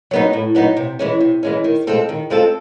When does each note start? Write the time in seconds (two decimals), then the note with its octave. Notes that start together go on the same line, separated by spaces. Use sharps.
0.11 F#3 B3 D#4
0.33 A2
0.55 F#3 B3 D#4
0.77 C3
0.99 E3 G#3 C#4
1.21 C3
1.43 E3 G#3 C#4
1.64 D#3
1.87 G#3 C4 F4 A4
2.09 D#3
2.30 G#3 C4 F4 A4